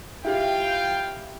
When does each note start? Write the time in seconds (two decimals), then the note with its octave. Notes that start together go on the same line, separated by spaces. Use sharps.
0.24 E4 F4 G4 F5 G5